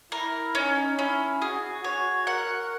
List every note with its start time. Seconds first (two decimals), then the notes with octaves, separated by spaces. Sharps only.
0.12 E4 A#4
0.55 C#4 D#4
0.98 C#4 E4
1.41 F#4 G#4
1.84 F#4 C#5
2.26 A#4 F#5